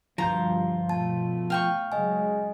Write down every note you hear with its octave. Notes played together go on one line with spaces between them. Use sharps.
D2 G2 F3 F4 A#5 G6
B2 A3 A5
F5 G5 C#6
C#3 F#3 G#3 D#5 G#5